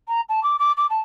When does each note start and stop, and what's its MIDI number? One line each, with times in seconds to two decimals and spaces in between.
0.08 0.21 82
0.29 0.42 81
0.43 0.56 86
0.59 0.72 86
0.77 0.86 86
0.90 1.01 81